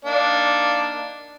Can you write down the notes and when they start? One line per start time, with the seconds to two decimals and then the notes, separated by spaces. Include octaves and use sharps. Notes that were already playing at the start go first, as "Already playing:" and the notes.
0.05 A#3 D4 D#4